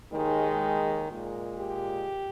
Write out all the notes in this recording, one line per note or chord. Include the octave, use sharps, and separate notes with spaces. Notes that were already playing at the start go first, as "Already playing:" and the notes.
D#2 D#3 G#3
A#2 G#3
G4